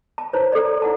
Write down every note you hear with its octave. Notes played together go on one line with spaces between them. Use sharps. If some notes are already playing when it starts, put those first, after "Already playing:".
A5
E4 C5 C#5
A4 D5
E4 F#5 A5